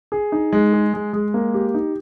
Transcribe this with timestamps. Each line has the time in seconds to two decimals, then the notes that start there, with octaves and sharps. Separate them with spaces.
0.12 G#4
0.32 D#4
0.53 G#3
0.73 G#4
0.94 G#3
1.13 G#3
1.34 A#3
1.54 G4
1.74 D#4